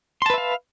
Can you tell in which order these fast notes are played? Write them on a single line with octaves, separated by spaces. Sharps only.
C6 A5 B4 E5 F5